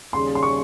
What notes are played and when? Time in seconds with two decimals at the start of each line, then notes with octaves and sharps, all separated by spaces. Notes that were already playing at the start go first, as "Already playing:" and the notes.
0.13 D#2 C#3 G3 C#4 G#4 C6
0.35 C6
0.43 C#6